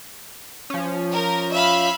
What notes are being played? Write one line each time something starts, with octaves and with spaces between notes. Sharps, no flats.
F3 C#4
A#4
E5 F5 B5